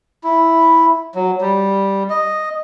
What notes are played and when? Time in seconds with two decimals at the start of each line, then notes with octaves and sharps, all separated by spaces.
0.24 E4
1.15 F#3
1.41 G3
2.10 D#5